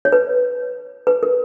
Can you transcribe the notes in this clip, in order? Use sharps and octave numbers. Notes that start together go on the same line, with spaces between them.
C#5
B4
B4
A#4